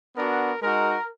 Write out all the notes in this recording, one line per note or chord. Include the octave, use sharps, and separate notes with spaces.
B3 D4 F#4 A#4
G#3 D#4 F#4 A#4